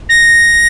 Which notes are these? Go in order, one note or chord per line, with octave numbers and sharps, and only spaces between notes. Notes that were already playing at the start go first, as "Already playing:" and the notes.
A#6